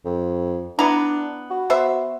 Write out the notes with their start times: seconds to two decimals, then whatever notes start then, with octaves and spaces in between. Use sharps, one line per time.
0.05 F2
0.79 B3 D4 E4 A#5
1.51 F#4
1.70 B3 C5 E5